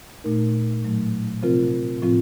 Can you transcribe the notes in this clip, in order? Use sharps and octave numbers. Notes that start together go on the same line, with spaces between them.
A#2 A3 D#4 A#4
A2 F#3 A3
C3 F3 C4 F4 A#4
A2 F3 C4 F4